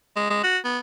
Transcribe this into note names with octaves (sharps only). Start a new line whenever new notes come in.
G#3
G#3
F#4
B3